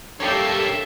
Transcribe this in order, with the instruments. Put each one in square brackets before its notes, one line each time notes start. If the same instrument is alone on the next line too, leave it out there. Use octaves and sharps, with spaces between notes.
[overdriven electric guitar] G2 A#3 [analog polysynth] G4 C#5 [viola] A4 E5